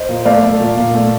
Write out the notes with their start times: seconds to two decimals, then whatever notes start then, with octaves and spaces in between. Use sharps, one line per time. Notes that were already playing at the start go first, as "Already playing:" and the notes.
Already playing: C5 D#5
0.09 A#2
0.25 A3 D5 F5
0.43 A3
0.60 A#2
0.77 A#2
0.95 A3